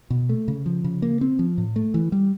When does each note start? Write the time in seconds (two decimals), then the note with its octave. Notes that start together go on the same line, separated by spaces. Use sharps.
0.10 B2
0.29 A3
0.48 C#3
0.66 F3
0.84 C#3
1.02 A#3
1.21 C4
1.39 F3
1.58 A2
1.76 A3
1.94 E3
2.12 G3